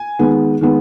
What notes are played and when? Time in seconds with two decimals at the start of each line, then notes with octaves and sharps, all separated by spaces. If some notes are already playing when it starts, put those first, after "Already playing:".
Already playing: G#5
0.19 D#3 G#3 B3
0.61 D#3 G#3 B3